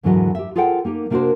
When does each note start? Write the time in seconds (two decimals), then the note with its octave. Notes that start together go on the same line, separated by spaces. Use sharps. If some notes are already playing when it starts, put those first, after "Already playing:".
0.03 D#2 G#2 D3 E3 F#3 D#5
0.35 G4 E5
0.56 F4 G#4 A4 C5 F#5 G5
0.85 A#3 D#4 G4
1.10 C3 A#3 D4 F#4 A#4 C5